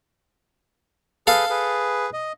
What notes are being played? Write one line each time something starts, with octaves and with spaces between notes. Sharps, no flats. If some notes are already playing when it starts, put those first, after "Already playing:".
G#4 A4 B4 F5
G#4 B4
D#5